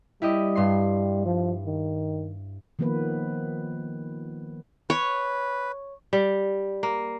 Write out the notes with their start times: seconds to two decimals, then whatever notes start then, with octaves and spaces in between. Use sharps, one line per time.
0.22 G3 E4 G4 D#5
0.55 G2 C6 C7
1.26 F3
1.66 D#3
2.79 D#3 F3 A#3 B3 B4
4.90 B4 C#5
6.13 G3
6.83 A#3